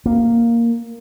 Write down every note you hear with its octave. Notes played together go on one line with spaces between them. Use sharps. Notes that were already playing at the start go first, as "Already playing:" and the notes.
A#3